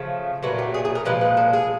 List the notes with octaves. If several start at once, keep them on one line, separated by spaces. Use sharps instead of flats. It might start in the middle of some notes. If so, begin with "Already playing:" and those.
Already playing: C#3 F3 A3
A#2 F#3 A3 B4
G4
G#4
G#4
A#4
A#2 F3 G#3 B4
B4
A4
G#4